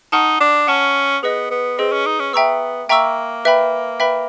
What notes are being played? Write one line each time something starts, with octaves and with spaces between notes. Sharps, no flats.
D#4 F#5 A5 C#6 F6
D4
C#4 F#5 A5 C#6 F6
B3 G#4 B4 D#5
B3
C4 G#4 B4 D#5
C#4
D#4
C#4
B3 E5 G5 A#5 C#6 E6
A#3 E5 G5 A#5 C#6 E6
B4 E5 G5 B5
B4 E5 G5 B5